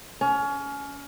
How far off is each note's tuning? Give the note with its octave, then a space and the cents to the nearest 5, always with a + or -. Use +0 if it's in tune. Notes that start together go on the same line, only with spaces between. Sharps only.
C#4 +25